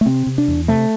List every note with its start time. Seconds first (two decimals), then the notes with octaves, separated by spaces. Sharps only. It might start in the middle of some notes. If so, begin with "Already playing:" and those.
0.01 A3
0.06 C3 C4
0.27 C3
0.38 D4
0.48 E2
0.68 C3 A3